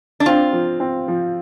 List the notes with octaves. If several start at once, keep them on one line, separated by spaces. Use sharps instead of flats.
D4
C4 F4
F3
C4
F3